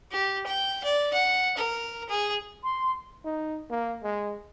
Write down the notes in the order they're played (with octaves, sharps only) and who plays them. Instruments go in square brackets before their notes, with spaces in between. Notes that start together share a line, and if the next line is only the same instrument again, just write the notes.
[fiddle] G4
G5
D5
F#5
A#4
G#4
[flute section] C6
[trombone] D#4
A#3
G#3